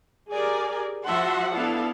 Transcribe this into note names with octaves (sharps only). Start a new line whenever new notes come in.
G4 G#4 A#4 D5 G#5
F3 F#4 E5 F#5 A5 C6
B3 D4 E4 A4 F5 A5